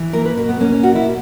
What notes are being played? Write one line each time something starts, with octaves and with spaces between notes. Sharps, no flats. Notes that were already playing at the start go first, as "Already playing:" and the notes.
Already playing: E3
A#3 A#4
B4
B2 A#4
B3
A#3 C#4
C#4
B2 F#4
E4